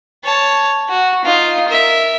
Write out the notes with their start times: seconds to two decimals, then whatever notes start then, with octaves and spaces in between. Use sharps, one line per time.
0.24 C#5 A5
0.89 F#4
1.25 D#4 F4
1.68 A#4 E5